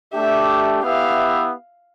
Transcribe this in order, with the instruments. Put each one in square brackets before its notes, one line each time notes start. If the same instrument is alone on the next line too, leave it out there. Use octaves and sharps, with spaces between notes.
[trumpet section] A3 D4 G4 [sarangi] E5
[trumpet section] B3 E4 G4 B4 E5 [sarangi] F5